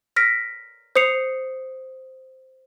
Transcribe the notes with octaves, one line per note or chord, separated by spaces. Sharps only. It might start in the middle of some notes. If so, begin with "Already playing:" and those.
F6 A#6 B6 D7
C5 D#6 C7 C#7 F7